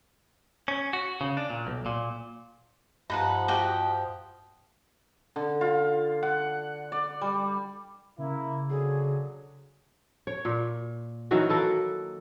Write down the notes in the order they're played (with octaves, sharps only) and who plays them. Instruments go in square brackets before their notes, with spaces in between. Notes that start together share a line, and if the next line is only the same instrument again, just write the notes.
[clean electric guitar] C#4
F#4
C#3
D4
A#2
B1
A#2
[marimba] G2 [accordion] F3 [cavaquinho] D#4 B4 F#5
[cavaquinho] F#4 G4 D#5
[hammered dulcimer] D3
F4
F#5
D5
G3
[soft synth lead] C#3 [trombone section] A#3 E4
[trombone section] D3 F#3 [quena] G#4
[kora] C#5
A#2
D#3 E3 F#3 F#4
A#3 A4 B4